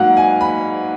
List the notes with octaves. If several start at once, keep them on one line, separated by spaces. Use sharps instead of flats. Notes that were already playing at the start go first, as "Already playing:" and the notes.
Already playing: G#2 F#3 A#3 F5 F#5
G#5
B5